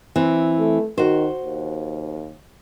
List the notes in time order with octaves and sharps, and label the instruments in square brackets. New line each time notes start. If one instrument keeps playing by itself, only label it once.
[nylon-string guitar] E3 C4
[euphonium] A3
[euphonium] D#3 [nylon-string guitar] F#4 C5
[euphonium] D#2